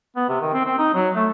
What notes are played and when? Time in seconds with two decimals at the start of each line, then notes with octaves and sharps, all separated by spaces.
0.16 B3
0.29 C3
0.41 D#3
0.53 C4
0.65 C4
0.78 D#4
0.94 F#3
1.15 A3